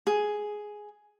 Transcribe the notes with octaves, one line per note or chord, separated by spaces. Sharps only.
G#4